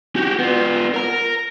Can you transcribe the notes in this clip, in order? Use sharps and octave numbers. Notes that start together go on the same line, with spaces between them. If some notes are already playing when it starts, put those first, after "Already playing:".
F#4 G4
B3 F4
A#4 A#5